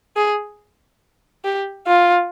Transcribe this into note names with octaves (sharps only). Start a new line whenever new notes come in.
G#4
G4
F4